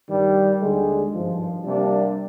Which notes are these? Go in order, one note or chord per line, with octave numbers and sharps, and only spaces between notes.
G2 D#3 G3
D#2 D3 G#3
G#1 G2 F3
C3 G3 A#3 D4